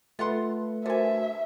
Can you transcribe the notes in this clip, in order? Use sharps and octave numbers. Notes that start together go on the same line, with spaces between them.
A3 B3 F4 A4 B4 F#5 C6
D3 F#4 A#4 C5 E5 G#5